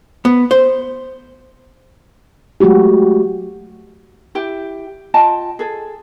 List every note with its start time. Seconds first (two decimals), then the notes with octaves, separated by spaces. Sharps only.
0.25 B3
0.51 C5
2.60 F#3 G#3 A3 F#4 G4
4.35 E4 G4 G5
5.14 F4 D#5 G5 A5
5.59 G#4 A4